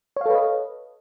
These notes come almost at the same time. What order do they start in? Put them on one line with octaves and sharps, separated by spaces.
C#5 F5 A4 B4 D#5